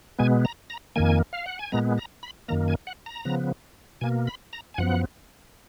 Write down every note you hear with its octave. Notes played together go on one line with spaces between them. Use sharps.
B2 G#3 B3 G#5
A#5
A#5
F2 D#3 A#3 G#5
F5
F#5
G#5
A#2 G#3 B3 A#5
A#5
B5
F#2 D#3 A#3 A#5
G#5
F#5
A#5
C#3 F3 B3
B2 A#3 G#5
B5
A#5
G#5
F#2 F3 B3 F#5